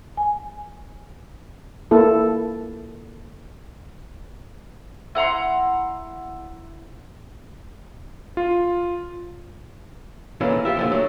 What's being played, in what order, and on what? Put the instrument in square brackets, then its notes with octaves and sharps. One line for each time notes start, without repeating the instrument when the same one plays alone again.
[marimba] G#5
[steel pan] A#3 E4 A4
[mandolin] E4 F#5 A#5 C6
[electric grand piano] F4
[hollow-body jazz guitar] A#2 E3 G#3 A3 C#4
F4 G4 E5
A#2 D3 F3
F#3 A3